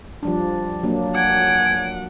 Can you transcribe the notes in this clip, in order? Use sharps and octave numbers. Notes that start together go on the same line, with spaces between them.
F3 G3 D4
F#3 A#3 D4
F#5 G#5 D7